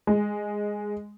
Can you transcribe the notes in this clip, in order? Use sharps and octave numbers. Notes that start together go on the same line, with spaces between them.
G#3